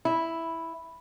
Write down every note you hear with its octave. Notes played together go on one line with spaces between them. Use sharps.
E4